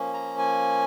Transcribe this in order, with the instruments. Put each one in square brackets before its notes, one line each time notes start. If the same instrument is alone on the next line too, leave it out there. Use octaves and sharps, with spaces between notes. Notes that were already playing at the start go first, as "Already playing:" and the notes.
Already playing: [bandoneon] F3 A#3 C#4
A#5
G#5